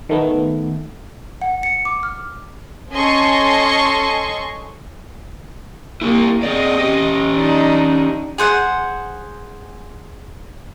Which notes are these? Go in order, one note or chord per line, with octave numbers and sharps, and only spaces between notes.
D#3 A3 B3
F#5
C#7
D6
F6
C#4 A4 D#5 G#5 C6 C#6
A#3 E4 G4
C4 G#4 D5 D#5
C#4 G4
D4 D#4
G#4 C5 F#5